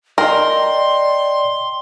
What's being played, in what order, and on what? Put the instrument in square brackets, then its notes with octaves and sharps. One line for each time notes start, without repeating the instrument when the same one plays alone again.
[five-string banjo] A#4 [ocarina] D5 [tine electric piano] D#5 G5 [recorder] C6